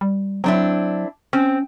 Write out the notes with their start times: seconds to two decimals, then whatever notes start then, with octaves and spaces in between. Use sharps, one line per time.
0.01 G3
0.44 F#3 C4 D4 E4
1.33 C4 C#4